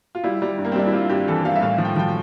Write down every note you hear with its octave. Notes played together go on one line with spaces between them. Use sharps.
F4
G3 E4
G3
G2
A#3
C4
G3 D4
E4
G3 F4
G2 G4
E3 A4
G3 F5
E5
A2 F5
F3
G5
F3 G5